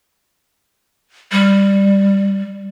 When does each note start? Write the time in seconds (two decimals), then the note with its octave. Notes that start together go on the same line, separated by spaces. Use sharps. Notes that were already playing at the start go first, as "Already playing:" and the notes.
1.32 G3